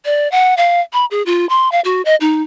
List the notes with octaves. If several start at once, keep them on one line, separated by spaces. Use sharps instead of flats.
D5
F#5
F5
B5
G#4
F4
C6
F5
F#4
D#5
D#4